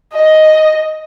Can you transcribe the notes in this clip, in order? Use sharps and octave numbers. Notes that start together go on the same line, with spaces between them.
D#5